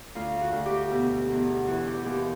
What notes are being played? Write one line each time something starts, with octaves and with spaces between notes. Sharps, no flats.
D2 F4
F#4
D2
G4
B2
E2
E3 F#4
G4
D#2 G4